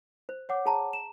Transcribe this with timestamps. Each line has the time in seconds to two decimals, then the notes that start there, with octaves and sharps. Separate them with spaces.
0.29 C5
0.49 C#5 F#5 D6
0.66 G#4 A5 A#5
0.93 E7